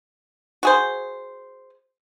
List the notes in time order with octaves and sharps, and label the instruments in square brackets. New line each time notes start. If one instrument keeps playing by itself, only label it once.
[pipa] F#4 G#4 C5